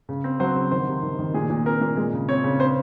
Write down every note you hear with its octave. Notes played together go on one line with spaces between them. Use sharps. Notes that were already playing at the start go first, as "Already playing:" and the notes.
C#3
C4
F#3 C5
C#3
D#3 C5
C3
D#3
D#3
A#2 G#4
A#2
C4 A#4
A#2
G#3
C#3
C4 C#5
C#3
C4 C5